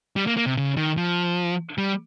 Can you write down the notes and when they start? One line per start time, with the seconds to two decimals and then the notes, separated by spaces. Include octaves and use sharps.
0.16 G3
0.27 A#3
0.37 A#3
0.46 C3
0.57 C#3
0.77 D#3
0.97 F3
1.78 G3